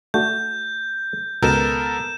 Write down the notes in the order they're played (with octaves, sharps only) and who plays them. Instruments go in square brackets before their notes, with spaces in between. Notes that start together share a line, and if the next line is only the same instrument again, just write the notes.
[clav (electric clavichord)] A3 D4 F#4 [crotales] G6
[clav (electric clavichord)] C#2 B2 [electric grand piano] B3 A4 A#4 [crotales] G6 E7